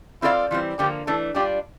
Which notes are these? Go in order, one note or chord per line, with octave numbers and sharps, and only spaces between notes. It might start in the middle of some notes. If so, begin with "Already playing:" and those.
C4 E4 F4 A4 D5 F5
E3 G3 C4 F4
D3 F3 A#3 G4
E3 A3 D4 A4
G3 D4 F4 G4